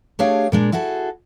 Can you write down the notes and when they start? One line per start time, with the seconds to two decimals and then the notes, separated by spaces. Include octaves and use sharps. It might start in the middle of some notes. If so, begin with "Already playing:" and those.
0.19 A3 D4 G4 G#4 C#5 F5
0.52 A#2 G#3 D4
0.72 E4 F#4 G#4 A4